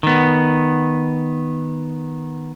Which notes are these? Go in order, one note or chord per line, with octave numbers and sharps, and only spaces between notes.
D#3 B3